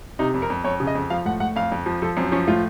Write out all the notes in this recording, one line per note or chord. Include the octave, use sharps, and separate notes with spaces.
C3 D#4
F2
A#4
F2
F2 C#5
C#3
D#5
F2
F3 F5
A2 F#5
A2 F#5
F2 F5
F2
F3
F3 A4
F#2 C4
F3 C#4
A2 F4